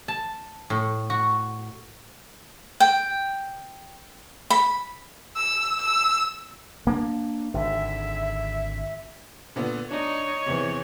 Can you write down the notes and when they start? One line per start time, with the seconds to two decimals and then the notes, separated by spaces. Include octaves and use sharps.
0.08 A5
0.70 A2
1.10 F#4
2.80 G5
4.50 B5
5.36 E6
5.81 E6
6.87 A#3 D4
7.54 G#1 D3 E5
9.56 A#2 D3 B3
9.91 D4 D#4 C#5
10.46 E2 C3